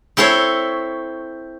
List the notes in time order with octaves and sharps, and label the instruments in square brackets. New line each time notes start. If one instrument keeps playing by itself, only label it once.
[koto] C4 E4 A4 C5 C#5